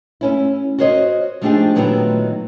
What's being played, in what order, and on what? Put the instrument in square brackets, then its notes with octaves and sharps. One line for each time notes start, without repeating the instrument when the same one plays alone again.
[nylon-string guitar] A3 C#4 E4
F#4 A#4 C5 C#5 D#5
F3 A3 D4 D#4 G4 G#4
A#2 D#3 F#3 A3 B3 E4